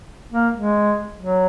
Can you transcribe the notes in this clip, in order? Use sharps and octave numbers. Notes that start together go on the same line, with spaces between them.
A#3
G#3
F#3